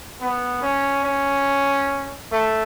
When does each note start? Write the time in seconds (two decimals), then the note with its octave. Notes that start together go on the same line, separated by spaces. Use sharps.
0.21 B3
0.62 C#4
1.04 C#4
2.32 A3